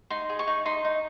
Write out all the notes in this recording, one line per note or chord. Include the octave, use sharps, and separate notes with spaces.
D#4 C6
G#4
C#6
D#4
D#4 C6
D#4